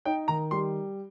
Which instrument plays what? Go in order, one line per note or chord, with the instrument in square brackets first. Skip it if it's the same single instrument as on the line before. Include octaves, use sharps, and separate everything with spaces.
[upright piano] D#4 [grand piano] G5
[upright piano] D#3 [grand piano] A#5
[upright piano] G3 [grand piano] C6